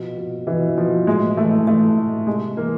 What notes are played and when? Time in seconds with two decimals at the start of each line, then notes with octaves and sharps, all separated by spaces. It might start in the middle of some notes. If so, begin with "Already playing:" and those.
Already playing: B2 F3
0.17 B2
0.47 B2 E3
0.77 B2 F3
1.07 A2 G#3
1.37 E3 A3
1.67 E3 A3
1.97 A2
2.27 C3 G#3
2.57 E3 A#3